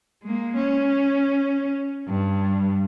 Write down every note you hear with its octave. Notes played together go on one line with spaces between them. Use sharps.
G#3 A#3
C#4
G2